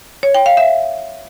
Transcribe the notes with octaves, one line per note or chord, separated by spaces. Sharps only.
C#5
G5
F5
E5